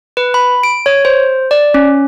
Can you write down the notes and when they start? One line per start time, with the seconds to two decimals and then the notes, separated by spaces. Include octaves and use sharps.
0.17 B4
0.34 B5
0.63 D7
0.86 C#5
1.05 C5
1.51 D5
1.74 C#4